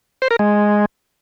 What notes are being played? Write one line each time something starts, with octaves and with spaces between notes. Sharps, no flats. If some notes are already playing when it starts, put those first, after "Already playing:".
C5
A#4
G#3